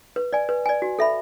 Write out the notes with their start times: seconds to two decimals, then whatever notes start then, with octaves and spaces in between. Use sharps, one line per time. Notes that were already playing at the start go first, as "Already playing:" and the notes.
0.16 B4
0.33 D5 G#5
0.49 B4
0.66 D5 G#5
0.82 F#4
0.99 A4 E5 B5